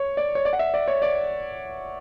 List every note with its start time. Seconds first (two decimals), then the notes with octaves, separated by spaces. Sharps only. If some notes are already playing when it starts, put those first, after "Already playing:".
Already playing: C#5
0.17 D5
0.35 C#5
0.45 D5
0.53 F#5
0.59 E5
0.74 D5
0.88 C#5
1.02 D5